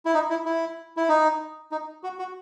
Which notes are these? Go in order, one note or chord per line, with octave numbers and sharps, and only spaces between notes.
E4
D#4
E4
E4
E4
D#4
D#4
F#4
F#4